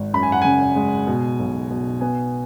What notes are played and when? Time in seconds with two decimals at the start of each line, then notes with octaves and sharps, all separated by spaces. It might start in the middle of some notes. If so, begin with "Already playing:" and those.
Already playing: G#1 G#2
0.13 F#2 B5
0.23 G#5
0.32 F#5
0.42 C#3 G#5
0.76 G#3
1.07 B2
1.40 B1
1.70 B2
2.01 B3 G#5